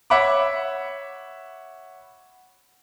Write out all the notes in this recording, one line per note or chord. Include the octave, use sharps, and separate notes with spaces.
C#5 E5 F#5 B5 D6